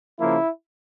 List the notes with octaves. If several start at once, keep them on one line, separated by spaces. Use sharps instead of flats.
C#3 F3 A#3 E4